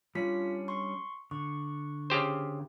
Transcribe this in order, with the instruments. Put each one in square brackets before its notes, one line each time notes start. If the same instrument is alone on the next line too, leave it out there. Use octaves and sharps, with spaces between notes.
[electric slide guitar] G3 C#4 D4 [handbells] F4 B6
[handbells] C6 C#6
[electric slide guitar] D3 [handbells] C#6
[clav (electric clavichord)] C#3 G4 C5